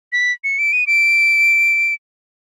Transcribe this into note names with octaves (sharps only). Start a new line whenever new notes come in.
B6
C#7
D7
D#7
D7